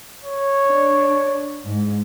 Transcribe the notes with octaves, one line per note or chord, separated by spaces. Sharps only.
C#5
D4
G#2